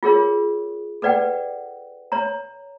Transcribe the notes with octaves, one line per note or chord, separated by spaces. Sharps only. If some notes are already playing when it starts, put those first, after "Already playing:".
F4 G#4 A#4 C#5
A4 B4 D5 F#5 G5
C#5 A#5